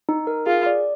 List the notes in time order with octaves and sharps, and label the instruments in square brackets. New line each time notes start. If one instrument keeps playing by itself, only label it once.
[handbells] D#4
A#4
[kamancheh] F4 [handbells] G#4
[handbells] D5